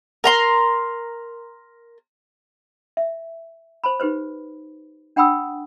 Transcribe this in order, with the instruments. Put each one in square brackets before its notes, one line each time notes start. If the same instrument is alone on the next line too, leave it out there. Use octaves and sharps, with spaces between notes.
[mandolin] A#4 A#5 C6
[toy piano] E5
C5 A5 B5
D#4 G4 B4 C5
D4 F#5 G5 B5 D#6 E6